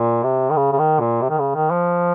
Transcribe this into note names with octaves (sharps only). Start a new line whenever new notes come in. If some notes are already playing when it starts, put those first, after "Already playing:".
Already playing: A#2
C3
D#3
C#3
C#3
D#3
A#2
C3
D#3
C#3
D#3
F3